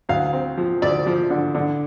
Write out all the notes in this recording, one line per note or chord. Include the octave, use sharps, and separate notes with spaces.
D2 F5
C4
F3
D2 D5
F3
D3
D3